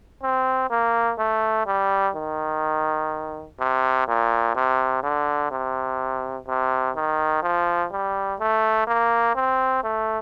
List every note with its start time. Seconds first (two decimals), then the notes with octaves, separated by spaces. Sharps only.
0.23 C4
0.70 A#3
1.19 A3
1.66 G3
2.15 D#3
3.59 C3
4.08 A#2
4.55 C3
5.03 D3
5.51 C3
6.47 C3
6.96 D#3
7.43 F3
7.91 G3
8.40 A3
8.87 A#3
9.35 C4
9.83 A3